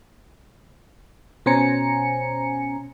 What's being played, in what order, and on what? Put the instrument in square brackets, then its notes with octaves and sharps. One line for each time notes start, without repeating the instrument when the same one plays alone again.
[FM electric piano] B2 C#4 C5 G#5 A#5 C#7